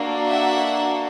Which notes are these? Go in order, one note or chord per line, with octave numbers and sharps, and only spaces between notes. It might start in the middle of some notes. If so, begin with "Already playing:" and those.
Already playing: A#3 D4 F#4 A4
E5 F#5